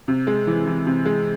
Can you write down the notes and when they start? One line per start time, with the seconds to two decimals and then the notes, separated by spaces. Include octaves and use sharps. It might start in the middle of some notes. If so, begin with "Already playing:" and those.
0.08 C3
0.27 G#3
0.47 E3
0.66 E3
0.86 C3
1.05 G#3